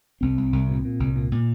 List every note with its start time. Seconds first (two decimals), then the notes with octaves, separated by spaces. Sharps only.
0.21 C2 C4
0.38 C2
0.53 C2
0.69 A#2
0.85 A#2
1.00 C2
1.16 A#2
1.32 A#2